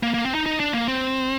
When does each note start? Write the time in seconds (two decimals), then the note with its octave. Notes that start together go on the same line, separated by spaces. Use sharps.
0.03 A#3
0.14 A#3
0.25 C4
0.35 D#4
0.46 D#4
0.60 D4
0.73 A#3
0.88 C4